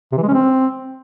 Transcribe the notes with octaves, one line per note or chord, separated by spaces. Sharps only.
C3
E3
G#3
C#4
C4